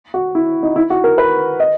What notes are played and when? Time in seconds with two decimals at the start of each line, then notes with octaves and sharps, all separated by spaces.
0.14 F#4
0.35 E4
0.63 D#4
0.76 E4
0.90 F#4
1.04 A#4
1.18 B4
1.60 D#5